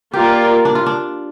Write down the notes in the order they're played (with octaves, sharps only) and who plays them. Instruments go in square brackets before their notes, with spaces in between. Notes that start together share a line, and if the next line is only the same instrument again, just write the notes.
[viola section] A#3 F4 A#4 D5 [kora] G4
[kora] D4
F4
D4